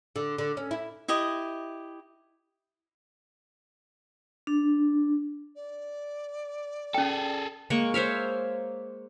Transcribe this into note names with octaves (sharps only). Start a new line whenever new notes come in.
D3
D3
C#4
E4
E4 G4 D#5
D4
D5
C#4 G#4 A4 G5
G#3 A#3 C#6
C5 C#5 E5 F5